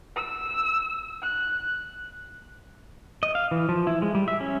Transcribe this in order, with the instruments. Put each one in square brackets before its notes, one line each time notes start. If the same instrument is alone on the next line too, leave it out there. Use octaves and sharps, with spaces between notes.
[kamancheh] E6
F#6
[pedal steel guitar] D#5
F5
E3
F3
E4
G#3
G3
E5
C#4